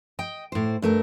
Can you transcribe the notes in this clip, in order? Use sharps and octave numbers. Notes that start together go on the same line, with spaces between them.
D#5 G5
A2 C5
G2 A3 A#4